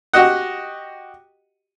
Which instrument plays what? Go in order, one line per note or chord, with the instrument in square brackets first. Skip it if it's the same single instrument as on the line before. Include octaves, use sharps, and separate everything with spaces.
[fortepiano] F#4 G4 D#5 F#5